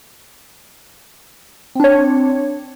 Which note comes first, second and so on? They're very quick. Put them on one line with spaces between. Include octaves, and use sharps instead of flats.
C4 D4 C#5